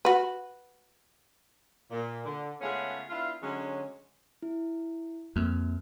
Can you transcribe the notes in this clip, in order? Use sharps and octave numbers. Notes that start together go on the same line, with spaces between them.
F#4 B4
A#2
D3
C#3 G#3 A3 B3 C#4 F4
B3 D4 E4 F4
D3 F#3 G#3 C#4
E4
F2 A#3